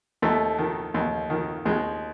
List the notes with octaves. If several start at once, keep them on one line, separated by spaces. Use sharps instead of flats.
D#2 A3
D#3
D#2
D#3
D#2 G#3